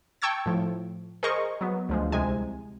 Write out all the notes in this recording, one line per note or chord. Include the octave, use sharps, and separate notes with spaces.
G5 A5 C#6 E6 G#6 A6
A2 F3
G#4 A#4 C5 D#5 C#6
F#3 B3
D2 F3 G#3
C2 C3 G#3 G#5